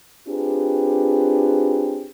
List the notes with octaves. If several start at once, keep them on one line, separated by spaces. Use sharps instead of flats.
C4 D4 F4 G4 G#4 B4